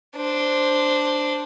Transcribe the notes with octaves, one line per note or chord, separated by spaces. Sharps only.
D4 C5